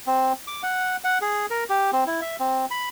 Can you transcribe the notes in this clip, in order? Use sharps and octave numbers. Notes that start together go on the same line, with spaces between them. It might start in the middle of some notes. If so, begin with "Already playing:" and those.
C4
D6
F#5
F#5
G#4
A#4
G4
C4
E4
E5
C4
B5